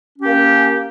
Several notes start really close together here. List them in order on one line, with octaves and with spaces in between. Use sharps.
C#4 G4 A#3